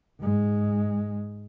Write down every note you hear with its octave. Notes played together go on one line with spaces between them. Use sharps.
G#2 G#3